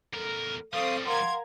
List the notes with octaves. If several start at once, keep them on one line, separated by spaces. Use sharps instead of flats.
E2 A4 A#4
F3 G3 C4 A4 F5 C#6 D#6
A#4 F5 F#5 C6 G#6